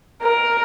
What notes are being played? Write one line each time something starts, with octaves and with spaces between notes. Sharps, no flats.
A#4